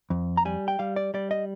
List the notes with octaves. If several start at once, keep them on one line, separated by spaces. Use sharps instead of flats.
F2
A#5
G3 G#5
G5
G3 F5
D5
G3 D5
D#5